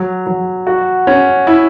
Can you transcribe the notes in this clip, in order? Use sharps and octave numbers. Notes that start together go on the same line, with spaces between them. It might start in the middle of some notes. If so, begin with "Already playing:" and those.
Already playing: F#3
F#3
F#4
C#4
E4